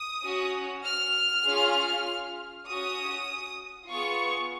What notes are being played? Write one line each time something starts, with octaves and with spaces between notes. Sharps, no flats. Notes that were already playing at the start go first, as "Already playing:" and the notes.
Already playing: D#6
C#4 F#4
F6
C#4 F4 G#4
C#4 F#4 D#6
B3 F4 G#4 C#6